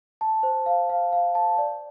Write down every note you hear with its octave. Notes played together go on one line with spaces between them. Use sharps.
A5
C5
F5
F5
F5
A5
D5